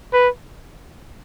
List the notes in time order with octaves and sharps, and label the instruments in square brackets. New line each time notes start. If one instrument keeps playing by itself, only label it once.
[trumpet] B4